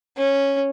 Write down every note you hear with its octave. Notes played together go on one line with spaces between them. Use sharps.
C#4